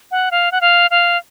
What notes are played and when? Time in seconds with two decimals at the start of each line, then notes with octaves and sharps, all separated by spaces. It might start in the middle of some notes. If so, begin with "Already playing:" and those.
0.11 F#5
0.31 F5
0.52 F#5
0.61 F5
0.90 F5